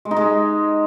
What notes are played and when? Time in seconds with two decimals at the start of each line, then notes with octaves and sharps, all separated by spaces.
0.05 G#3
0.11 D#4
0.17 G#3